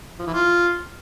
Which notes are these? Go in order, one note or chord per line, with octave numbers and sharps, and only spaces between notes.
F3
E3
F4